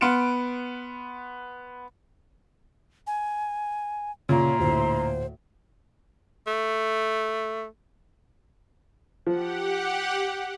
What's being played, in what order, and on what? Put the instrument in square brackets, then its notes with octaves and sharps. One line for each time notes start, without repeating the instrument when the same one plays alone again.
[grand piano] B3 C6 F6 C#7 D7 E7
[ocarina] G#5
[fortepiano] A#2 [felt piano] C#3 [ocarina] C#5 [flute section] E5 A#5 C6
[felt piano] D2 A2 [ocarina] C5
[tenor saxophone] A3
[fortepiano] F3 [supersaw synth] G4 F#5